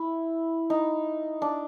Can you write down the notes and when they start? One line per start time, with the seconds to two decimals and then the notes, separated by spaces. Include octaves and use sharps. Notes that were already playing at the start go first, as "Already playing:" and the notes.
Already playing: E4
0.70 D#4
1.42 D4